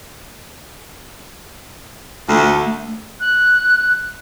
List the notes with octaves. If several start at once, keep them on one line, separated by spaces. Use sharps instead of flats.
D2 A3
F#6